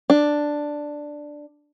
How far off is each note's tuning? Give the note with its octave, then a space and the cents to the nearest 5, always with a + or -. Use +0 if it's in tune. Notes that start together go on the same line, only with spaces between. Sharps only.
D4 +5